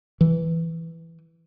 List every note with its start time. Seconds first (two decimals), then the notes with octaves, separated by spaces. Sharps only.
0.21 E3